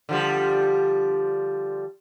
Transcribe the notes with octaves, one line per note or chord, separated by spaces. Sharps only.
D3 F3 G3